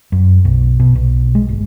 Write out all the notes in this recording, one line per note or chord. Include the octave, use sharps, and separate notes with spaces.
F#2
B1
B2
B1
G#3
G1